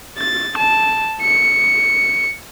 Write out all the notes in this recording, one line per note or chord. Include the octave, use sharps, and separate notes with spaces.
A6
A5
C#7